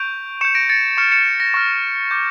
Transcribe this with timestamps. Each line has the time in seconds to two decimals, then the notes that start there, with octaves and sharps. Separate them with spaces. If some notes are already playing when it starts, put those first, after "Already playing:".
Already playing: C#6 G6 D7 F7
0.41 C#6 G6 C#7 E7
0.55 A#6 D7
0.69 A6 C#7
0.97 C#6 F6 C#7 E7
1.12 C#7 E7
1.40 A#6
1.54 C#6 F6
2.11 D6 G6